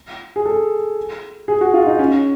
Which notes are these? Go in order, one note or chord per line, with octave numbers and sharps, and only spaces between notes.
G#4
A4
G#4
F#4
F4
D#4
C#4